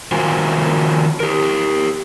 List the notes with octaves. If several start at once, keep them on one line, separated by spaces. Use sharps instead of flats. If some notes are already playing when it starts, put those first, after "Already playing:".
D#3 F4 F#4 A#4 C5 G#5
G4 A#4